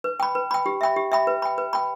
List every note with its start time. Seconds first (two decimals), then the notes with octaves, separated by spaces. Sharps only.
0.04 B4
0.20 G5 B5
0.35 B4
0.51 G5 B5
0.66 G4
0.81 E5 G5 B5
0.96 G4
1.12 E5 G5 B5
1.27 B4
1.42 G5 B5
1.58 B4
1.73 G5 B5